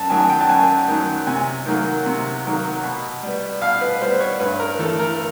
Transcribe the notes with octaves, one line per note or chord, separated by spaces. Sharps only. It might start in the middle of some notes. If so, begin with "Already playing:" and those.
Already playing: F#2 A5
D#3 F#3 G#5
G5
A5
F#2 G#5
D#3 F#3
C3 G#5
D#3 F#3 A#3
C3
D#3 F#3 A#3
B2
G3 B3
B2 F5
B4
G3 B3 C5
C#5
G2 B4
A#4
E3 A3 A4
A#4